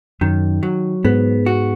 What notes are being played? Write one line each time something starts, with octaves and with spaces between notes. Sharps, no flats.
F#2 D#3
F#3
G#2 B3
F#4